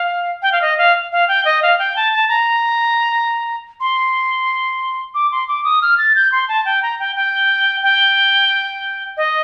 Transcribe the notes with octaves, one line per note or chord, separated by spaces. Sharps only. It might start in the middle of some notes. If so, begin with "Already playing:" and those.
Already playing: F5
G5
F5
D#5
F5
F5
G5
D#5
F5
G5
A5
A5
A#5
C6
D6
C6
D6
D#6
F6
A6
G6
C6
A5
G5
A#5
G5
G5
G5
D#5